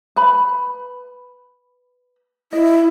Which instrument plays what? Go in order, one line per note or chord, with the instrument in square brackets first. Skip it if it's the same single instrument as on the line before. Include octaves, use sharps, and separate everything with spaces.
[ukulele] B4 B5
[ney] E4 [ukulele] D#5